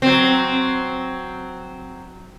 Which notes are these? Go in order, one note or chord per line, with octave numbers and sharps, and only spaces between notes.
F#3 C4